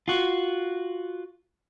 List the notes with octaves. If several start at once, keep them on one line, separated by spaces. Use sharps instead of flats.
F4 F#4